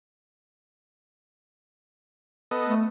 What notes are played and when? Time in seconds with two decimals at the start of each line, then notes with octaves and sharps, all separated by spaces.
2.51 B3 A4 D#5
2.67 A3